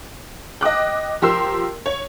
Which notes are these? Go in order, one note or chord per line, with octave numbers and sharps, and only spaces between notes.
D#5 G5 D6 F#6
F3 G4 A#4 C6 E6
C#5